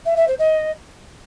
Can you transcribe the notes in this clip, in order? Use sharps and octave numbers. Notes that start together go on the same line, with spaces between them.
E5
E5
C5
D#5